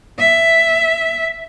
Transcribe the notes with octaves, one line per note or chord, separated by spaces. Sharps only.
E5